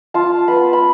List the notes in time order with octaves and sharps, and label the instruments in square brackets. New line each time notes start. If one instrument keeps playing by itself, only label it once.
[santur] F4 A5
B3 B5
B5